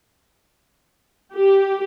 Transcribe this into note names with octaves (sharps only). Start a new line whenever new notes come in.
G4